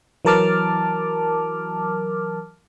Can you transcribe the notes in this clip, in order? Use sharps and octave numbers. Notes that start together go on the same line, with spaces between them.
E3 F#3 A#4 A5 D6 F6